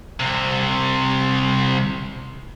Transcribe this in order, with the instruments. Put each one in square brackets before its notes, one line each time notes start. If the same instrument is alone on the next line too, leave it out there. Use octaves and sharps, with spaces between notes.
[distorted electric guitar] C2 C3